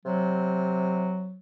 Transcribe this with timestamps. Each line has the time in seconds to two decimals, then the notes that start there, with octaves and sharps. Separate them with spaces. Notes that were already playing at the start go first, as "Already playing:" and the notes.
0.05 C3 F#3